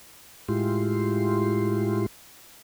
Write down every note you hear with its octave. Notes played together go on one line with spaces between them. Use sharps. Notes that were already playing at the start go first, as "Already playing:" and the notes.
A2 G#3 E4 F4 G4 C6